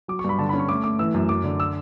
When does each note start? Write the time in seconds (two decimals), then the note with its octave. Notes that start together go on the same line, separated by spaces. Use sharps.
0.08 F#3 D6
0.19 C#6
0.24 G2 B5
0.39 D3 A5
0.49 B5
0.54 C#4
0.60 C#6
0.69 A3 D6
0.84 A3 D6
0.99 E3 E6
1.14 F#2
1.29 F#2 D6
1.44 D3
1.60 E6